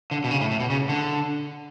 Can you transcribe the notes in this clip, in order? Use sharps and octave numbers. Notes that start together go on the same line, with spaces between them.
D3
B2
C#3
A2
A2
B2
C#3
D3